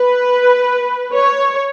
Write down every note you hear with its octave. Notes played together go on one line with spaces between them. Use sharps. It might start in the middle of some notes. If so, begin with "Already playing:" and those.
Already playing: B4
C#5